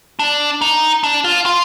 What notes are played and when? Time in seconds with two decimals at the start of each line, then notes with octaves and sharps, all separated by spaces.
0.19 D4
0.61 D#4
1.04 D4
1.24 F4
1.46 F4